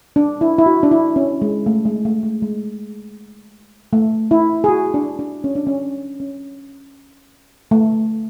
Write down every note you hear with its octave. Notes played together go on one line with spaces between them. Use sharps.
D4
E4
E4
F#4
D4
E4
C#4
G#3
A3
G#3
A3
A3
G#3
A3
E4
G#4
F#4
D4
D4
C#4
D4
C#4
C#4
A3